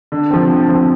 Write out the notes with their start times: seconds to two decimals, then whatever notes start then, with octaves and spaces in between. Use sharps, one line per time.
0.12 D3
0.30 F3 C4
0.49 D3
0.69 F3 C4